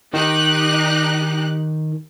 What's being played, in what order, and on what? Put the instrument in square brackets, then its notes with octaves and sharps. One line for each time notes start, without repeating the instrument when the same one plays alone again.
[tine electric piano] D#3 [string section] D#4 G4 F#6